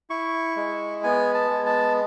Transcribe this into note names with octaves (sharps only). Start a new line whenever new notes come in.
E4 C#6
G#3
B3 G#5
A5
G#3
A5